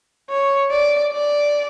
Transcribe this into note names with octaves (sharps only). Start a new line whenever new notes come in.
C#5
D5
D5